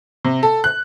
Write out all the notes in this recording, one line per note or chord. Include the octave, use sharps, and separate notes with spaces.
C3
A4
F#6